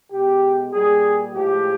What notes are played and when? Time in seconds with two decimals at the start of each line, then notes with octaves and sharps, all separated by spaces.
0.11 B2 G#3 G4
0.72 A#2 G3 G#4
1.33 A2 F3 G#3 G4